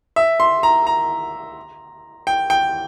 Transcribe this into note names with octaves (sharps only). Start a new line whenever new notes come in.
E5
C6
A#5
A#5
G5
G5